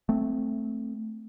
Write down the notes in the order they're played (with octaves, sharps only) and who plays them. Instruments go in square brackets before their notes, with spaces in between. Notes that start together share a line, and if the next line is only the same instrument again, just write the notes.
[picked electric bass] A3 C4